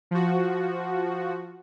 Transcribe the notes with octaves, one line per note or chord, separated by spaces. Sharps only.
F3 F#4